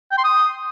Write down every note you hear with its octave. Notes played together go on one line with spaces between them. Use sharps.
G5
C6
D#6